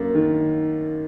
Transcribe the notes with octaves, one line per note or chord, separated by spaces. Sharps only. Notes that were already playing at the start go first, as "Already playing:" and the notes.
Already playing: F#2 A#3
D#3